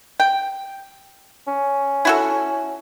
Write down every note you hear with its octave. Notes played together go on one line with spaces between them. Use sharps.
G5
C#4
E4 F#4 A4